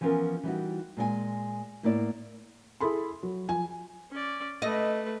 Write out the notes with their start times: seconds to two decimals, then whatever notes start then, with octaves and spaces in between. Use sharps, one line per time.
0.01 E3 F3 B3 C#4 F4 A#4
0.43 E3 G3 D#4 F#4
0.97 A#2 G#3 A#4 G#5
1.83 A2 A#3 B3 E4 D5
2.80 E4 G#4 A4 B5 C6
3.23 F#3
3.48 F3 G#5
4.11 C#4 D5
4.62 A3 B4 D#5